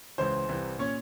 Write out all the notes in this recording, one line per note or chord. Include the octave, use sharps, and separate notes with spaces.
C#2 C#3 E3 C5
C2 C3 E3
A#2 C#4 C#5